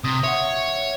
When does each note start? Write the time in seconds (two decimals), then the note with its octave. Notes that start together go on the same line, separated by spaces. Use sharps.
0.04 C3 D#6
0.23 C#5 E5 F#5